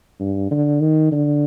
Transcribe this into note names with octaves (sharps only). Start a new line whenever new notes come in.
G2
D3
D#3
D3